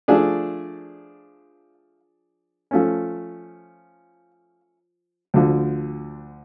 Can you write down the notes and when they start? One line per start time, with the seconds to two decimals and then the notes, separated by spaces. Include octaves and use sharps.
0.08 F3 A3 D4 G#4 D5
2.71 F3 A3 C#4
5.34 D2 D3 F3